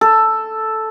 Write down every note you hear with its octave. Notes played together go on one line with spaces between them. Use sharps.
A4